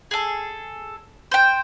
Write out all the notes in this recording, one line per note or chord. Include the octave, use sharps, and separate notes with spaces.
G#4 A4
C5 G5